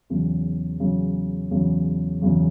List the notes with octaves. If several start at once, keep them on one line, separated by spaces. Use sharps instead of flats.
E2 C#3 F#3
E2 C#3 F#3
E2 C#3 F#3
E2 C#3 F#3